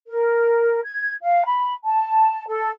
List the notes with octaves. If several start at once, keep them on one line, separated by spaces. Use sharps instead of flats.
A#4
G#6
F5
B5
A5
A4